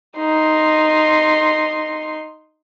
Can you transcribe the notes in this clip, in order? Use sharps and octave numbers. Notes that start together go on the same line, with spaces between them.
D#4 C6